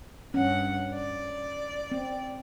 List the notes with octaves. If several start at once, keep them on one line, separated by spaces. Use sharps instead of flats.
G2 C#4 F#5
D5
C4